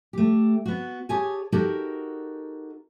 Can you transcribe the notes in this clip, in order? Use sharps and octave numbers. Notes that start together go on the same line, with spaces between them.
A3 G4
B3 F#4
G4 G#4 C#5 G#5 A5
D#4 F#4 G4 A4 A#4